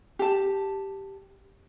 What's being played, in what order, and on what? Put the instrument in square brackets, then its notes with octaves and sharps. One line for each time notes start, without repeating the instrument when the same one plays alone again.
[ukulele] G4 A5